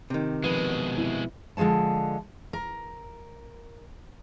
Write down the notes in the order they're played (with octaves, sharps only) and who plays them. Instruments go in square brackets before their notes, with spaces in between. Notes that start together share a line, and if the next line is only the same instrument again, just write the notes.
[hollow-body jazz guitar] C3 D#3
[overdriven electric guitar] B2 G#3 [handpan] F3 [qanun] B3
[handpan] C4 E4
[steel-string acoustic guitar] D3 F3 G#3 C#4 A5
A#4